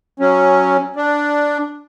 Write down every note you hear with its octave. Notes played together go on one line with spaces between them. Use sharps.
F#3 C#4
D4